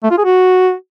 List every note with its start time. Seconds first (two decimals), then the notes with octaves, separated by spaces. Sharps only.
0.03 A3
0.11 F4
0.18 G#4
0.25 F#4